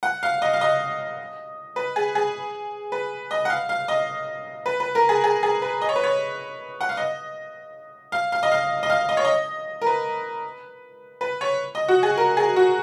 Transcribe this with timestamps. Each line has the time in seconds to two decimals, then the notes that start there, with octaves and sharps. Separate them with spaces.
0.03 F#5
0.23 F5
0.42 D#5
0.53 F5
0.61 D#5
1.76 B4
1.96 G#4
2.15 G#4
2.92 B4
3.31 D#5
3.45 F#5
3.50 F5
3.69 F5
3.88 D#5
4.66 B4
4.80 B4
4.95 A#4
5.09 G#4
5.24 G#4
5.43 G#4
5.62 B4
5.81 D#5
5.89 C#5
5.96 B4
6.04 C#5
6.81 F#5
6.89 F5
6.97 D#5
8.12 F5
8.32 F5
8.43 D#5
8.52 F5
8.83 D#5
8.90 F5
9.09 D#5
9.17 C#5
9.25 D#5
9.82 A#4
9.86 B4
11.21 B4
11.41 C#5
11.75 D#5
11.88 F#4
12.03 G#4
12.17 A#4
12.37 G#4
12.56 F#4